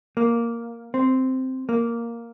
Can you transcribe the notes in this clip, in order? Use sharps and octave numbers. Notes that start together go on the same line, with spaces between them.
A#3
C4
A#3